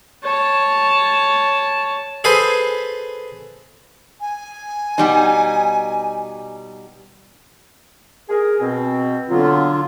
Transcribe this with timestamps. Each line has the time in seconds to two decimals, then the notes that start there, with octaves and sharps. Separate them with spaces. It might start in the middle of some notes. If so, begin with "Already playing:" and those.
0.24 C#5 A5
2.24 G#4 A4 B4 C5 G#5
4.21 G#5
4.98 B2 G3 D#4
8.29 G#4 A#4
8.61 B2 C4
9.30 D3 F#3 B3 F4